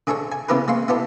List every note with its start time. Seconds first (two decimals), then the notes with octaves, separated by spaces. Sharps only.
0.07 D3 G#4 A4 C#5 C#6
0.32 G#5
0.49 C#3 B3 E4 G4 A#4 B4
0.68 G#3 A#3 C6 C#6
0.88 B3 E4 G4 A4